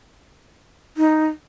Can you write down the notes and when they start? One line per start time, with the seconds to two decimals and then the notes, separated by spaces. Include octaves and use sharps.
0.97 D#4